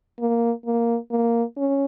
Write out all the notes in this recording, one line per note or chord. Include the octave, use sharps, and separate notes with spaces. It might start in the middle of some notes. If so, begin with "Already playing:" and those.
A#3
A#3
A#3
C#4